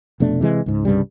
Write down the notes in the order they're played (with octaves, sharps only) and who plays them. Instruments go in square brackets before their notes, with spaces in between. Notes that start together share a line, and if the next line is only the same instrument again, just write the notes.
[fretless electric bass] F1 B2 A3 D4
C3 E3 G#3
C#2 G#2
C2 G2 C#3 G3